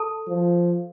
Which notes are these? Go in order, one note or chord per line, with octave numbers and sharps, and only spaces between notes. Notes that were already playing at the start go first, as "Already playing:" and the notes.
Already playing: A4 A5
F3